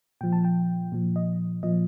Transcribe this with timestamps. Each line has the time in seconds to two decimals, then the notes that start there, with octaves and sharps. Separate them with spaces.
0.21 A#2 F3 G5
0.33 A5
0.45 G5
0.92 A#2 F3
1.16 D#5
1.63 A#2 F3 D#5